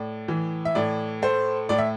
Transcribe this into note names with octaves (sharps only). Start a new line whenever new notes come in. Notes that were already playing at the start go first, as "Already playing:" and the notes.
Already playing: A2 D5
E3
E5
A2 D5
A3 C5
A2 D5
E5